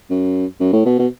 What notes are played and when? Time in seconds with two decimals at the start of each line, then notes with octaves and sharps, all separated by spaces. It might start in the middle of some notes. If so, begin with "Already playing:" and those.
0.10 F#2
0.61 F#2
0.73 A2
0.86 B2
0.99 B2